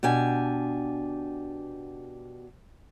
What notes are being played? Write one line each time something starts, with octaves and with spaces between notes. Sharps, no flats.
B2 D4 G4 G#5